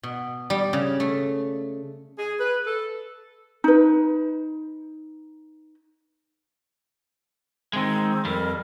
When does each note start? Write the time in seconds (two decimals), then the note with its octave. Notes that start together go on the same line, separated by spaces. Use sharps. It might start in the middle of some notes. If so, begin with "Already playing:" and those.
0.03 B2
0.50 G3
0.73 C#3
1.00 A3
2.19 G#4
2.39 B4
2.66 A4
3.64 D#4 B4
7.73 D#3 G#3 C4
8.25 F2 G3 A#4